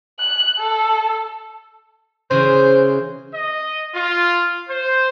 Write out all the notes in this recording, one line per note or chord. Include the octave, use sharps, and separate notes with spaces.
F#6
A4
C#3 E3 F#4 C5
D#5
F4
C5